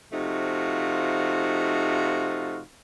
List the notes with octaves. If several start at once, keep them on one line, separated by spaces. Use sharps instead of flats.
C3 F3 A3 D#4 F4 F#4